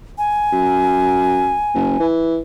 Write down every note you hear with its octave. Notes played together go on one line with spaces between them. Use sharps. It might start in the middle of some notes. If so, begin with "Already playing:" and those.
G#5
F#2
F#1
E3